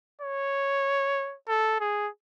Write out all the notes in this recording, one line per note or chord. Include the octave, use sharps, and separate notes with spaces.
C#5
A4
G#4